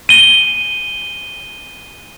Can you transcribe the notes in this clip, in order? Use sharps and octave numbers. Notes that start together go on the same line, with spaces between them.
D#7 G7